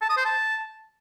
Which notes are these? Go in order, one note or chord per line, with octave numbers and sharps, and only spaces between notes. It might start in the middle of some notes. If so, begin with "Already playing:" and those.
A5
D#6
C5
A5